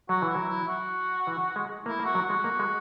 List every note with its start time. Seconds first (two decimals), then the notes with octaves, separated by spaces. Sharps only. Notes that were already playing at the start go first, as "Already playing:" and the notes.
0.09 F#3 F#4
0.22 E3
0.29 E4
0.35 F#3
0.48 E4
0.68 F#4
1.27 E3
1.56 G#3
1.85 A#3 E4
2.00 A#3
2.05 F#4
2.15 F#3
2.24 F#4
2.30 G#3
2.44 A#3
2.59 G#3